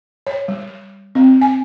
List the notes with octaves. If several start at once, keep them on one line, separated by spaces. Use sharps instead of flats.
C#5
G3
C4
G#5